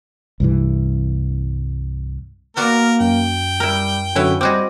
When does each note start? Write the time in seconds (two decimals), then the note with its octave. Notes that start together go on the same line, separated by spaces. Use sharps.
0.40 C2 G2 E3
2.57 A#3 B3 F#4 A#4 D5
3.01 F#2 G5
3.60 G3 E4 A#4
4.15 F#2 D3 C#4 E4 F#4 B4 C#5
4.41 G3 C4 F#4 G#4 D#5 D6